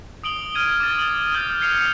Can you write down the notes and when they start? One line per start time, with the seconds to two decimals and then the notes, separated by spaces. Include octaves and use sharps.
0.24 D#6 D7 F#7 G7
0.55 F6 G#6 D#7
0.80 D6 A6
0.98 D#6 F#7 G7
1.34 D#6 F6 G6 A6 F#7
1.60 F6 G#6 C7 C#7 F7